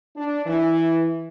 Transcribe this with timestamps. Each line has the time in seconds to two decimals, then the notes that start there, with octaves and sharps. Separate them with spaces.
0.16 D4
0.46 E3